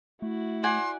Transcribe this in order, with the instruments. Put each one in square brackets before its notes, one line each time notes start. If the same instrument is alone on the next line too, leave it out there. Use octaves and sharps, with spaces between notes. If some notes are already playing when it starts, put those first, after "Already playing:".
[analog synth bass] A3 [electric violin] E4 F#4
[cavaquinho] D5 F#5 G#5 [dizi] C6